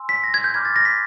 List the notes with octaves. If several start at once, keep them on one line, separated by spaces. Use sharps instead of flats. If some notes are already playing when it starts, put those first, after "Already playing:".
Already playing: G#5 C6 E6
B6
A#6
G#6
G6
B5 D6 F6 G#6
A6
A#6
B6